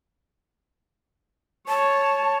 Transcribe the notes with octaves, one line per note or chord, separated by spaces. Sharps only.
C#5 A5